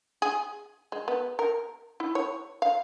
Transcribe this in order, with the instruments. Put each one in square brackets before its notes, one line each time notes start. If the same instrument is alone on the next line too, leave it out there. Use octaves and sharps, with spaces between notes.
[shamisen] G#4
G#3
B3
A#4
E4
C#5
F5